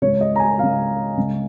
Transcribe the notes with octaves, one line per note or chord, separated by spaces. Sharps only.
C#2 C#3 C#5
D#5
A#5
G#5
C#2 C#3 F5
C#2 C#3